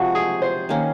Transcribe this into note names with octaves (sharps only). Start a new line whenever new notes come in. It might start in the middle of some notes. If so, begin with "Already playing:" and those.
Already playing: C3 F3 G#3 F#4 G#4
G#4
C5
D#3 A#3 C#4